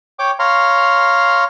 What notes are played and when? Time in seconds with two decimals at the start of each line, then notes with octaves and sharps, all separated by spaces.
0.19 C#5 G5 D6
0.39 C#5 F5 A#5 C6